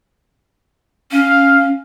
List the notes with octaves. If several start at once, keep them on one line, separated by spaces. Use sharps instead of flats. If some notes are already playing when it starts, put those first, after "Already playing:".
C#4 F5